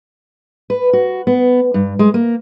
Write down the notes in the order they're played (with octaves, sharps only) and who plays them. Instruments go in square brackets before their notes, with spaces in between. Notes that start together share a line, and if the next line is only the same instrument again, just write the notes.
[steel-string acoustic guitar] B4
F#4
B3
G2
G#3
A#3